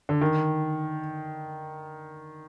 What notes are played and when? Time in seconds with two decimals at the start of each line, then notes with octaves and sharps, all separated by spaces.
0.09 D3
0.21 D#3